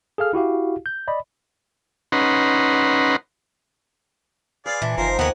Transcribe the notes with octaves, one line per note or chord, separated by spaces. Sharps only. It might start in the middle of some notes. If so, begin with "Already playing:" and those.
G#4 A4 F5 F6
E4 F#4 G4 F5
G6
D5 D#5 B5
C#4 D#4 B4 F#5 A#5 C6
G#4 B4 D5 F5 C6
A#2 E3 D4 E5
F#1 F3 A#3 D#4 A#4 C5
D#2 D#3 B3 A#4 F#5 G#5